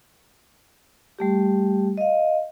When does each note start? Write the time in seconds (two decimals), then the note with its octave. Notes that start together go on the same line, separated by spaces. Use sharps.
1.19 G3 A3 G4
1.97 D#5 F5